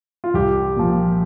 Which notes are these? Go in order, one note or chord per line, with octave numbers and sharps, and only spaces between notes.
F4
C2 G4
A#2 F3